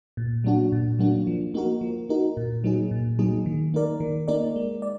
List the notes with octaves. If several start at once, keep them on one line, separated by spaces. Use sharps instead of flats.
A#2
F#3 A#3 D4 F#4
A#2
F#3 A#3 D4 F#4
F3
A#3 D#4 F#4 A#4
F3
A#3 D#4 F#4 A#4
A#2
F#3 A#3 D#4 G#4
A#2
F#3 A#3 D#4 G#4
D#3
A#3 D#4 A#4 D5
D#3
A#3 D#4 A#4 D5
G#3
D5